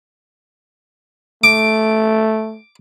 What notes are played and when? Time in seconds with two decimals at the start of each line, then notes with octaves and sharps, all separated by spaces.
1.44 A3 D6